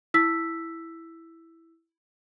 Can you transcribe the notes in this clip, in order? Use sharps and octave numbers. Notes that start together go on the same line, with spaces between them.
E4 E6 B6